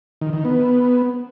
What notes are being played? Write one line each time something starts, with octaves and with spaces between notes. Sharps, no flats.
D#3
D#3
B3